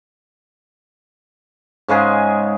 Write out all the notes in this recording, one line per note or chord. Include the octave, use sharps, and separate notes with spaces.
G#2 C#3 G#3 G#4